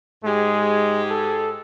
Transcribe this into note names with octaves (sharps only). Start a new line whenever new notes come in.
G#2 G#3 G4 G#4
A4